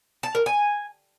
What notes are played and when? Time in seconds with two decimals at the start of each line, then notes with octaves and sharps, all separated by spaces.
0.23 A5
0.35 A#4
0.46 G#5